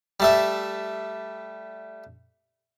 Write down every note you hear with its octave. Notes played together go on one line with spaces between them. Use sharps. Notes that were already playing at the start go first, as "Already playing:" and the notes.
G3 A3 E5